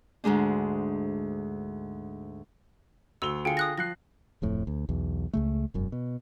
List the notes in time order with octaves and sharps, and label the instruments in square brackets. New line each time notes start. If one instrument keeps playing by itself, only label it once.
[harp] D2 G#2 G#3 D4
[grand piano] D2 F7 G7 [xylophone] E6
[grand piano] D3 F4 G#4 [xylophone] G5 C#7
[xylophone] D#6 F#6 A#6
[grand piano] F3 F#6 C7 [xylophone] A#6
[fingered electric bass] D1 F2 A2
D2
B1 E2
C#2 C#3 A3
E1 F#2
B2